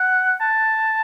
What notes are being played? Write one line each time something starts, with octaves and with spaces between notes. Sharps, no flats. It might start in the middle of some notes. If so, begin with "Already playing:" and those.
Already playing: F#5
A5